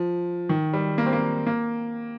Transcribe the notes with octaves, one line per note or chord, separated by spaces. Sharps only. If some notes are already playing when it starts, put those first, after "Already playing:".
Already playing: F3
D#3
G3
A#3
C4
A#3
A#3